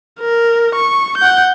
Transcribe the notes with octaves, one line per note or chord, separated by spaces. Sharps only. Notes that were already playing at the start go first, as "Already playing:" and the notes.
A#4
C#6
F#5 G6